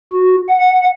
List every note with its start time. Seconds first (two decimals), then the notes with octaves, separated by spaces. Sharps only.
0.12 F#4
0.49 F#5